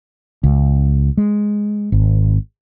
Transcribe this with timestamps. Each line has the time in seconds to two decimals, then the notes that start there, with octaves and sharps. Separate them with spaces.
0.44 C#2
1.17 G#3
1.92 G#1